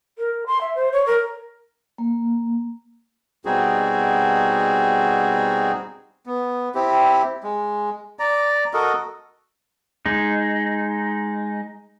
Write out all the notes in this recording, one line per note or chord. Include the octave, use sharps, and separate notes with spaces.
A#4
C6
E5
C5
C#5
A#4
A#3
B2 G3 C4 D#4 F#4 G#4
B3
C4 E4 G4
G#3
D5 A#5
F#4 A4 A#4 D#5
G#3 D#4